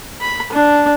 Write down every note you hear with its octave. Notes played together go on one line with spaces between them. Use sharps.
B5
D4